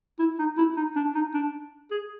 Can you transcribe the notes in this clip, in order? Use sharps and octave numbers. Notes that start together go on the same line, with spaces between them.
E4
D#4
E4
D#4
D4
D#4
D4
G#4